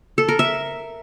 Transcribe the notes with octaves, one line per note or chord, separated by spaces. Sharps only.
A4
A#4
E5